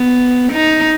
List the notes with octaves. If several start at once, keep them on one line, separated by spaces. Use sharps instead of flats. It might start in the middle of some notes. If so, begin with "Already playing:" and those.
Already playing: B3
D#4